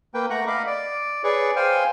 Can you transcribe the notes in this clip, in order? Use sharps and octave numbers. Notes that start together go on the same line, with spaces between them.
A#3 B4 G5
A3 F#5 A#5 C#6 F#6
D#5 F5 B5 D6
D5
G#4 B4 C#5 D5 C#6
C5 F5 G5 G#5